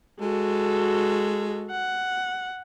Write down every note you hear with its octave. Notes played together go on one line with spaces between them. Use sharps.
G#3 F#4 A4
F#5